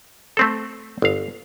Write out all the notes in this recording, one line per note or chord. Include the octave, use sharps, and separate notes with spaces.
A3 C4 A4
G1 F5